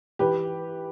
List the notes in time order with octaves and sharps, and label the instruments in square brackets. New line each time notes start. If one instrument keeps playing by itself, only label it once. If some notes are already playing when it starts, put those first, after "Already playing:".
[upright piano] E3 G4 B4